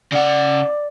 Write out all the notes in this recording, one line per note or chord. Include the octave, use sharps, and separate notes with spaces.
C#3 D5 F#5